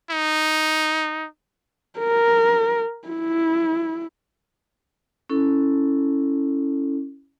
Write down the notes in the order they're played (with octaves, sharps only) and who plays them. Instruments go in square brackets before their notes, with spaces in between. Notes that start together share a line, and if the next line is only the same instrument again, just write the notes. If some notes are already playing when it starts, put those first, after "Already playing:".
[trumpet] D#4
[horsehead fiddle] A#4
E4
[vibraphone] C#4 E4 A4